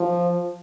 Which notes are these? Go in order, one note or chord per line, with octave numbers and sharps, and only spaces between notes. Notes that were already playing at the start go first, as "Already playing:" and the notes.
Already playing: F3